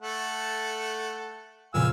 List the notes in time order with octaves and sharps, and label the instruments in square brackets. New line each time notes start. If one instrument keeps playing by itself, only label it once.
[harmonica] A3 A4 F#5
[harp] F2 A#2 C#3 [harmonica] F5 G#5 E6